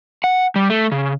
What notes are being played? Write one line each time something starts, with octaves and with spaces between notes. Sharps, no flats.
F#5
G3
A3
C#3